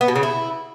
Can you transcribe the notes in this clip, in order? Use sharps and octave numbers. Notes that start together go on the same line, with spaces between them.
B3
B2
C#3
E4